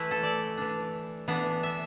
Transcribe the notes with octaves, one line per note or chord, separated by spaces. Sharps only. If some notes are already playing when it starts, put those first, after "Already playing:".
Already playing: E3 A3 E4 B4
A4
D5
E3 D4
E3 B3 D4
E5